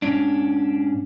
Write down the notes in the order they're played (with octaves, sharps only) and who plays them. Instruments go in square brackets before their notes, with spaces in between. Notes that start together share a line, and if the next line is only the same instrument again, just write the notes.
[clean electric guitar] G#2 C#4 D4